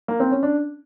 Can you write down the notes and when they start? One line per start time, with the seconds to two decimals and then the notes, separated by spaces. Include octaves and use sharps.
0.08 A#3
0.20 C4
0.31 C#4
0.43 D4